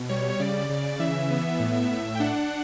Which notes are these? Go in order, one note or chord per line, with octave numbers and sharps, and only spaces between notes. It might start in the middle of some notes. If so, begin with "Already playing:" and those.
Already playing: B2
G3 C#5
C#5
C#3 D5
C#3
E3 E5
B3
A2
A2
G5
D4 F#5